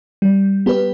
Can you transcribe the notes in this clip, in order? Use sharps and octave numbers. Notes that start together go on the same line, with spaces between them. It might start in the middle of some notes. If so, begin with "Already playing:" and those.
G3
B3 G4 B4